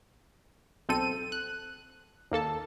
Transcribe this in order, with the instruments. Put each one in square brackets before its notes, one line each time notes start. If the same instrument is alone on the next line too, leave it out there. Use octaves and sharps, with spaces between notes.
[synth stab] B1 C4 A4 D#7
F#6
D#2 A#3 A4 A5